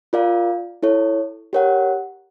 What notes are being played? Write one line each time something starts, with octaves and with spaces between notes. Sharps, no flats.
F4 A#4 D5 F5
E4 A4 C#5
G4 A#4 C#5 F#5